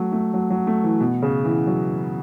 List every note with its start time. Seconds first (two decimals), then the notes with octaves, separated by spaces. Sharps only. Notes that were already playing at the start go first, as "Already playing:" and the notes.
Already playing: F#3 A3
0.12 A3
0.34 F#3
0.50 F#3
0.67 A3
0.84 E3
1.01 B2
1.22 C#3
1.45 E3
1.67 F#3